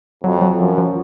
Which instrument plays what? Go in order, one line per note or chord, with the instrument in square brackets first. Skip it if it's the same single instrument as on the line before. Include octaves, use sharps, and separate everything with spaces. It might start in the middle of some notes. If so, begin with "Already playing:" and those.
[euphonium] F2 [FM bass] F#3
[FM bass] F#3
[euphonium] F#2 [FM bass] F3
[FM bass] F3